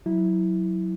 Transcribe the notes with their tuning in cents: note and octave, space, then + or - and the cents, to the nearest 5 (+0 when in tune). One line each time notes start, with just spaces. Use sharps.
F#3 +0 E4 -10